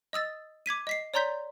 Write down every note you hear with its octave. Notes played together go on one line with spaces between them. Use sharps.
D#5 D#6 E6 A6
D6 G#6 B6 D#7
D#5 B6 C7
C#5 D5 A#5 C6 G6 B6